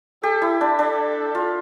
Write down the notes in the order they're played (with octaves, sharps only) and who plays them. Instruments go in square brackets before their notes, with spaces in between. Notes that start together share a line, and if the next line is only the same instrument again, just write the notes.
[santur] G4 [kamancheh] A4
[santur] E4
D4
[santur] D4 [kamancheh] A4
[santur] F4